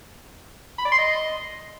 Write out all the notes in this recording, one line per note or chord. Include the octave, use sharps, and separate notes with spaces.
B5
D5
C6
D#5